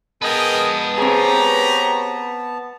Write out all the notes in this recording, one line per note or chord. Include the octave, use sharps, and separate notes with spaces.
B3 G#4 A#4 B4 D#5 G5 A5
C4 G4 G#4 C#5 A#5